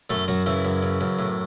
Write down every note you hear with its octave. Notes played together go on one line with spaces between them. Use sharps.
F#2 A3 A4
F#2 F#3 F#4
C#3 E3 E4
F#2
C#3
F#2
A2